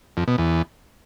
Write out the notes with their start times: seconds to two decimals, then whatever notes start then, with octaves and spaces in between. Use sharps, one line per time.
0.17 F2
0.28 B2
0.38 E2